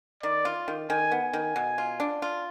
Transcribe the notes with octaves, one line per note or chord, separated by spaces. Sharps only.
D#3 D5
F4
D#3
D#3 G#5
B3
G#5
D#3
B2
F4
D4
F4